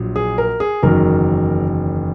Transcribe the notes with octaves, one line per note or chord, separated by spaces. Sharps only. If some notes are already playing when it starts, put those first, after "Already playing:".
Already playing: A#1 A#2 F#3
G#4
A#4
G#4
F#1 E2 D#3 F#3 A#4